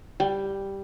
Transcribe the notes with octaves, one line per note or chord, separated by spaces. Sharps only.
G3